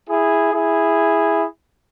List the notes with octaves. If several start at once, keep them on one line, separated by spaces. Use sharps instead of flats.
E4 G#4
E4 G#4